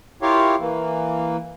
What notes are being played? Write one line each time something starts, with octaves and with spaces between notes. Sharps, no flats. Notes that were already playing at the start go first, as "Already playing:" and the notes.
E4 F4 G4 A#4 C#5 F5
E3 A#3